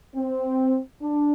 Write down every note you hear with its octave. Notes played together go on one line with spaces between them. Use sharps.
C4
D4